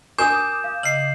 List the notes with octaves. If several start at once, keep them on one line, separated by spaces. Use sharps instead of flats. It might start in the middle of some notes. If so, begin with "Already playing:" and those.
F#4 A#4 G#5 D6 D#6 G6 C7 E7
F5
C#3 D#5 C7 F#7